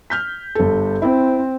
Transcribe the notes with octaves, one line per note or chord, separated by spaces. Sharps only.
F6 G6 B6
G1 A4
C4 E4